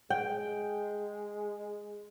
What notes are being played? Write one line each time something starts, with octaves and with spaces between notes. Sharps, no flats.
G#3 G5